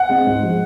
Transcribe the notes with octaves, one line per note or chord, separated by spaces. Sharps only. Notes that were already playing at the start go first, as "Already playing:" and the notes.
Already playing: F#5
G#3 C4
G#2
F3 G#3